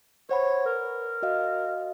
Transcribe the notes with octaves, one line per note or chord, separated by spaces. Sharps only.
C5 C#5 F#5 B5
A#4 B4
F#4 D#5 F5